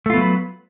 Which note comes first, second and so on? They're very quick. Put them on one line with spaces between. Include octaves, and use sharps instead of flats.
A3 F4 B3 F#3 B4